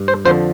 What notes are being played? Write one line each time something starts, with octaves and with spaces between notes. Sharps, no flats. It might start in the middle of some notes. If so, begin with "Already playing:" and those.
Already playing: G2
C5
F2 D3 F3 C5